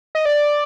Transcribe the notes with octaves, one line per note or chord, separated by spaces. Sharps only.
D#5
D5